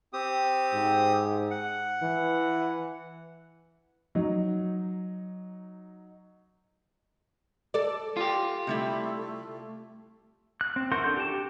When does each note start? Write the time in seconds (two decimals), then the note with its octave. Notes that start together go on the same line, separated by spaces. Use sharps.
0.13 C4 G4 D#6
0.73 G#2
1.51 F#5
2.02 E3
4.15 F#3 D#4
7.74 A4 D5
8.17 F4 G4 F5
8.67 C3 G3 A3 E4
10.61 F#6
10.76 C4
10.92 E3 F#4 A#4 C6 G6
11.04 D4 A4 G6
11.17 G4 A5
11.28 G4